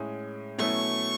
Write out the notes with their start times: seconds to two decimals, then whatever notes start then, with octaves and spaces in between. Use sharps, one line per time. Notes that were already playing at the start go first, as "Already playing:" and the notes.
Already playing: A2 G#3 C#4
0.58 B2 F#3 A3 C#4 E4 C#6